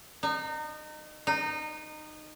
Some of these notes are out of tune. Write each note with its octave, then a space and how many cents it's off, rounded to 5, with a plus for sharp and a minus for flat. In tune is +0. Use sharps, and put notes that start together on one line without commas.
D#4 -30
D#4 -20